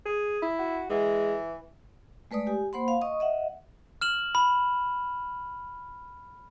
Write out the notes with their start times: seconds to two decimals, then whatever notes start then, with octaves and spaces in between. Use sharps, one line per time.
0.06 G#4
0.42 E4
0.59 F#4
0.90 E3 G#3
2.31 G#3 A3 B4 D5 D#6
2.47 G4 G#5
2.73 A#3 C5 F#5 B5 C6
2.88 F5
3.01 D#5 C#6 D#6
3.20 D#5 E5 F#5
4.01 F6 E7 F#7
4.35 B5